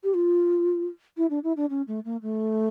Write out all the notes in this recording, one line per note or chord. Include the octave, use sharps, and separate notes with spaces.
G4
F4
E4
D4
E4
D4
C#4
A3
A#3
A3